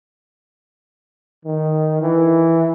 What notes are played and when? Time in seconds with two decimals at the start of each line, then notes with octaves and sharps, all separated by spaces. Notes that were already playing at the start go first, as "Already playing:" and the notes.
1.45 D#3
2.01 E3